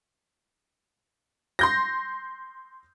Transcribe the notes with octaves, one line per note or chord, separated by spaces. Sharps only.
C6 G6 A#6